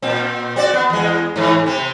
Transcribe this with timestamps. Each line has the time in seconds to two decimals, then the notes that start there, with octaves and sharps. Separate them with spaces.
0.02 A#2 C4
0.56 C4 F#4 D5
0.74 B3
0.90 E2 G#3
1.36 G#2 E3
1.66 C3 C4